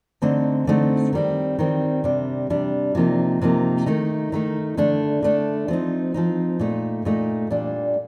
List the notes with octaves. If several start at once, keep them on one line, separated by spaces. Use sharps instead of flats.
D3 A3 C4 D#4
D3 A3 C4 D#4
D#3 G3 C4
D#3 G3 C4
C3 G3 D4
C3 G3 D4
C3 F3 A#3 D#4
C3 F3 A#3 D#4
D#3 A3 D#4
D#3 A3 D#4
D3 A3 D4
D3 A3 D4
F3 C4 D#4
F3 C4 D#4
A#2 A3 D#4
A#2 A3 D#4
A#2 G3 D4